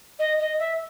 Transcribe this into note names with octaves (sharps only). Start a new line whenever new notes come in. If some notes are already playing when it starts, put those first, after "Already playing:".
D#5
D#5
E5